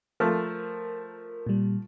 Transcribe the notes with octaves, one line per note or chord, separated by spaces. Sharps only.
F3 A3 A#4
A#2 G3